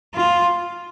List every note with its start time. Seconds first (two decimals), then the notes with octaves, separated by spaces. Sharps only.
0.14 F4